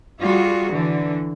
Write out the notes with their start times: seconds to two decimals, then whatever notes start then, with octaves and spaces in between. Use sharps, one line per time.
0.21 G3 F4 F#4 G#4
0.73 D3 E3